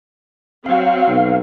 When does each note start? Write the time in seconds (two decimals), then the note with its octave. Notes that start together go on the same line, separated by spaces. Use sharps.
0.66 F#3 C4 F5
1.08 B1